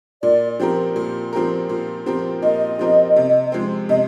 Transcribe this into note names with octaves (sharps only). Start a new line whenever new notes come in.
A#2 D5
F3 C4 G4 A#4
A#2
F3 C4 G4 A#4
A#2
F3 C4 G4 A#4
A#2 D#5
F3 C4 G4 A#4
C3
F3 G#3 C4
C3 D#5